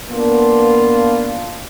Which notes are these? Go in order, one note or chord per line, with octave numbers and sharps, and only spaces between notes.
A#3 B3 D4 F4